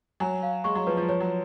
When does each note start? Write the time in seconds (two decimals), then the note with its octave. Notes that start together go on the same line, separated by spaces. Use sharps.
0.20 F#3 G#5
0.43 F5
0.64 G#3 C#6
0.75 F#3
0.87 F3 B4
0.97 F3
1.09 F3 C#5
1.20 F#3